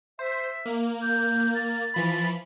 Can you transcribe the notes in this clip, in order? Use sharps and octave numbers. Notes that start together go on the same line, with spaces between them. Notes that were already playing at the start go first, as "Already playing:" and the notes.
C5 E5
A#3
G6
A6
E3 F3 B5